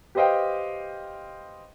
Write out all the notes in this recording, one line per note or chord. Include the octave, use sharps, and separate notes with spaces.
G4 B4 C5 D#5 F5 G5